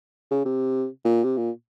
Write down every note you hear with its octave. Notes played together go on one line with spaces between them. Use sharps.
C#3
C3
A#2
C3
A#2